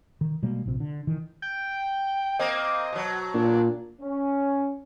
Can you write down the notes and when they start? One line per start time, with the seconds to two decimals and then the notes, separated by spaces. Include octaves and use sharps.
0.21 D#3
0.43 B2 G3 G#3 A#3
0.66 A#1 C3
0.80 D3
1.07 D#3 E3
1.42 G5
2.39 A#3 C4 D#5
2.92 B2 F#3
3.34 A#2 D4
4.01 C#4